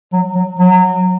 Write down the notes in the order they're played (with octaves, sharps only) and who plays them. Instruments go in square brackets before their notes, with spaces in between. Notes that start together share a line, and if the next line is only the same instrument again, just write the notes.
[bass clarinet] F#3
F#3
F#3